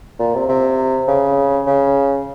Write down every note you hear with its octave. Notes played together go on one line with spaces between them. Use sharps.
A#2
C3
C3
C#3
C#3